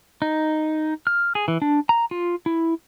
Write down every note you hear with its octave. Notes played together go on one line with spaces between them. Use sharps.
D#4
F6
G#4
E3
D4
A#5
F4
E4